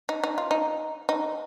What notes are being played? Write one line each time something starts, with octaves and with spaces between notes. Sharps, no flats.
D#4
D#4
F4
D#4
D#4